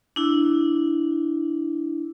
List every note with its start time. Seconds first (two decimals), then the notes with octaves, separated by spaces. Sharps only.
0.16 D4 E4